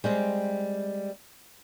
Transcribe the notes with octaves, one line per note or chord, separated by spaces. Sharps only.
G3 G#3 C4